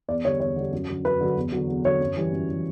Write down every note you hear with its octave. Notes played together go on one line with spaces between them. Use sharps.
E2 D5
D3 G3 C#5
E2 C#5
D3 G3
F#2
D3 F#3
F#2 B4
D3 F#3
E2
D3 F#3
E2
D3 F#3 C#5
F#2
E3 G3
F#2
E3 G3